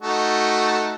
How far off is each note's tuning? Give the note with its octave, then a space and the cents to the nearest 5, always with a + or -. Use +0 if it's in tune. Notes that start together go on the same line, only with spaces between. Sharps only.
A3 +0 D#4 +0 F#4 +0